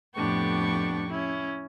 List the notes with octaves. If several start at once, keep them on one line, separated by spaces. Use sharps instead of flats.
F2 A2 B3 D4 G4 C#6
C#4 E4